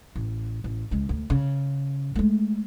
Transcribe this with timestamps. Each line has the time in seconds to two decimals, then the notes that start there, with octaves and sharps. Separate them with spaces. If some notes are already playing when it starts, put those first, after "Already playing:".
0.16 A1
0.64 A1
0.91 C#2 G#3
1.09 D2
1.30 C#3
2.15 G#3 A3